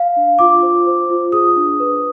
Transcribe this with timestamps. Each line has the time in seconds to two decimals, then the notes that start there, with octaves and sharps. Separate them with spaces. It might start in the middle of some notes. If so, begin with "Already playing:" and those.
Already playing: F5
0.16 D4
0.39 F4 D6
0.62 C5
0.87 C5
1.10 F4
1.32 G#4 D#6
1.56 D4
1.80 B4